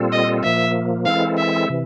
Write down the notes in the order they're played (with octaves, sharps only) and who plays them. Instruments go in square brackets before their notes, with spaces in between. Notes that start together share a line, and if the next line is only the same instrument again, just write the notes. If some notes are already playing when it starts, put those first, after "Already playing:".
Already playing: [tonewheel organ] A#2 G3 C4 F4 A4
[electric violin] D#5
[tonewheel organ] A#2 F3 A#3 [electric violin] E5
[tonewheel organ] E3 G#3 C4 E4 A4 [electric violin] F5
[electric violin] E5
[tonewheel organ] C3 E3